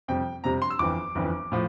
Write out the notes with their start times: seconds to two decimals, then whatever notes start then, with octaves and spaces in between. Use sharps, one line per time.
0.08 F2 C3 G3 G5
0.44 F2 C3 G3 A#5
0.62 C6
0.70 E6
0.79 G1 F2 E3 D6
1.15 G1 F2 E3
1.52 A2 F3